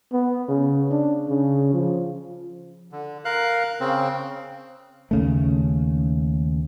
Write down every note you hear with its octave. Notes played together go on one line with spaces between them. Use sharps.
B3
C#3
D4
C#3
F3
D3
A#4 F5 F#6
C#3 C4
D#2 C#3 A3